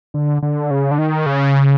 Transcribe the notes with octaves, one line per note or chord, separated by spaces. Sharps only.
D3
D3
C#3
D3
D#3
C#3